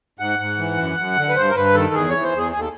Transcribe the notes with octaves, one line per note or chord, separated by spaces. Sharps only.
G#2 F#5
G#2
E3
F#2
F#2
D3
B4
G2 C5
A#4
G2 B4
D#3 A4
E2 G#4
E3 C#5
C5
E2
G#4
D#2 G#4
A4